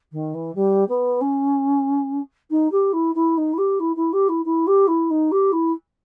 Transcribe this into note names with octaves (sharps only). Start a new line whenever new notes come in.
D#3
E3
G3
B3
C#4
D#4
G4
E4
E4
D#4
E4
G4
E4
E4
G4
E4
E4
G4
E4
D#4
G4
E4